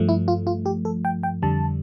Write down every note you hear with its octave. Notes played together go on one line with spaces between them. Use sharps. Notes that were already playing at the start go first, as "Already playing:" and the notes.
Already playing: G2 F3 A3
E4
F4
F4
G4
A4
G5
G5
F2 D3 G3 A5